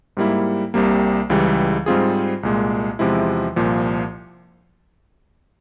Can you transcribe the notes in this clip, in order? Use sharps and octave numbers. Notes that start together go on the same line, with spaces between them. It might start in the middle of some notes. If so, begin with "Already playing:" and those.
G#2 G3 A#3 E4
C2 C3 G3 A#3
C#2 C#3 E3 G3
G#2 G3 C4 F4 G#4
C2 A#2 G#3
E2 C3 F3 G#3 E4
C2 A#2 F3